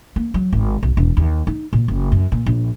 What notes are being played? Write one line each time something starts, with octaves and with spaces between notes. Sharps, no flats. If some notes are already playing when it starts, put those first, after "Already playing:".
A#3
F#3
G#1
B1
E1
D#2
D#4
A#2
F#1
F#2
A#2
A#1